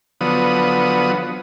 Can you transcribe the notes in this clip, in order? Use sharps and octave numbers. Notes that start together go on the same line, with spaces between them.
D3 F3 F#3 B3 D#6